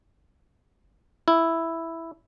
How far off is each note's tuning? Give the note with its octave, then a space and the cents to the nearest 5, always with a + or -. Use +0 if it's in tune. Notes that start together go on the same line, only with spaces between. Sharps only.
E4 +0